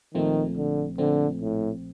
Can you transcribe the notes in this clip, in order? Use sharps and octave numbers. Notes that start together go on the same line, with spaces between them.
A#1 A#2 D#3 F3 A3 C4
D3
A#1 A#2 D3 F3 A3 C4
A2